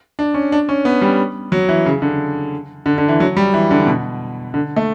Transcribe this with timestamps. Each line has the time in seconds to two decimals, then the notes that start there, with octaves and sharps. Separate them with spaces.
0.19 D4
0.34 C#4
0.52 D4
0.69 C#4
0.85 B3
1.02 G3
1.52 F#3
1.69 E3
1.86 C#3
2.02 D3
2.86 D3
2.98 D3
3.08 E3
3.20 F#3
3.37 G3
3.54 E3
3.71 D3
3.87 B2
4.54 D3
4.77 A3